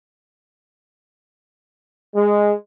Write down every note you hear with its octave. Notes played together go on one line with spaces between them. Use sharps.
G#3